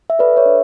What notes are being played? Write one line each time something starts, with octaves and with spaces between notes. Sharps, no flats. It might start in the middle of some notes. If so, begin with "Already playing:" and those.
E5
A4 B4 D5
C#5 E5
D4